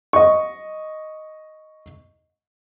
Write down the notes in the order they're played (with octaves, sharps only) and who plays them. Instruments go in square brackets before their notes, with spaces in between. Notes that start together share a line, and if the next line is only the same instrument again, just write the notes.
[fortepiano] D#5 C#6